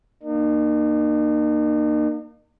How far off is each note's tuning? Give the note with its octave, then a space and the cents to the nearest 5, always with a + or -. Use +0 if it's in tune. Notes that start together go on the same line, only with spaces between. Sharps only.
A#3 +0 D#4 -40